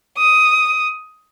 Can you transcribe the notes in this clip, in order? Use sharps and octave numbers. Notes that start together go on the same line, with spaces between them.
D#6